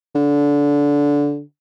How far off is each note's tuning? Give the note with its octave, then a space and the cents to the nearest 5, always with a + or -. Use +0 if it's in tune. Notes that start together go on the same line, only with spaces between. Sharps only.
D3 -20